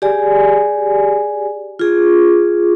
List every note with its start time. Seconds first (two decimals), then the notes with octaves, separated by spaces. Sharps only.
0.02 G4 G#4 D5 G#5
1.79 F4 G#4